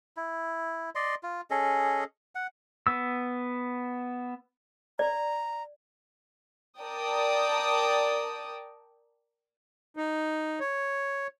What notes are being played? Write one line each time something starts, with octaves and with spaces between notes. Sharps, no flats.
E4
D5 D#5 C6
F4
C#4 G#4 A4 D#5
F#5
B3 E6
D5 A#5
A#4 D5 G5 A5 D#6
D#4
C#5